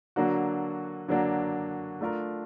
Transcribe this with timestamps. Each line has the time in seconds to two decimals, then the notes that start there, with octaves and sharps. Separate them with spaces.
0.16 D3 F#3 A#3 D4 F#4
1.08 D3 F#3 A#3 D4 F#4
2.01 A3 D4 F4 A#4